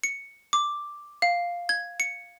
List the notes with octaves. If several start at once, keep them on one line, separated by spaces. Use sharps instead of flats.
C#7
D6
F5
G#6
C#7